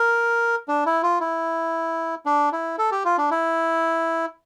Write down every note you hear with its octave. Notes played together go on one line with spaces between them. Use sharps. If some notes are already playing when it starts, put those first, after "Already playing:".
Already playing: A#4
D4
E4
F4
E4
D4
E4
A4
G4
F4
D4
E4